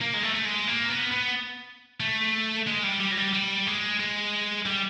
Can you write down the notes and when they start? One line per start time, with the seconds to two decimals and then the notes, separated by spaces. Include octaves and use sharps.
0.01 A#3
0.14 G#3
0.23 A3
0.35 A3
0.45 G#3
0.68 A#3
0.89 B3
1.11 B3
2.00 A3
2.67 G#3
2.83 G3
3.00 G3
3.11 F#3
3.17 G3
3.33 G3
3.67 G#3
4.00 G#3
4.66 G3